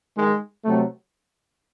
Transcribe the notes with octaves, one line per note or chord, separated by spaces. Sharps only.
D#3 G#3
C3 F#3 A3